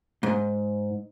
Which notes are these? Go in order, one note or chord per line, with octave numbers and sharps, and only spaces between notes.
G#2